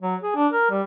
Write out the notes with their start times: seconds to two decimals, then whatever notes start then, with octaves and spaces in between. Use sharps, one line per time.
0.02 F#3
0.23 G#4
0.35 D4
0.52 A#4
0.70 G3